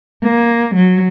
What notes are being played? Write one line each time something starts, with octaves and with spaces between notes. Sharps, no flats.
A#3
F#3